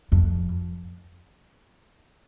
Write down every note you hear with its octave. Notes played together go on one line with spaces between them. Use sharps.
F2